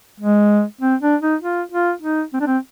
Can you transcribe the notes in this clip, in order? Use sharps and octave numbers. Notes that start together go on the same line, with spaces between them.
G#3
C4
D4
D#4
F4
F4
D#4
C4
D4
C4